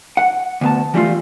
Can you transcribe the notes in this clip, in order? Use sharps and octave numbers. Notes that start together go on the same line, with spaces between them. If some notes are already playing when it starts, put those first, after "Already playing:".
F#5
D2 B3 A5
E3 G3 A3 F4